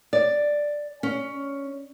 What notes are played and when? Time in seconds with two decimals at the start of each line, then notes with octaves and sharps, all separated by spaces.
0.13 D5
1.03 C#4